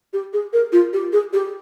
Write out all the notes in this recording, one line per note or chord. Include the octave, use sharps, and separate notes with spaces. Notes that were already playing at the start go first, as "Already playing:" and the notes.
G4
G#4
A#4
F4
G4
G#4
G4